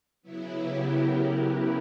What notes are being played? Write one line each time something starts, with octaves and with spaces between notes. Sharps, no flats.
C#3 F#3 B3 E4
G4
A#4
B4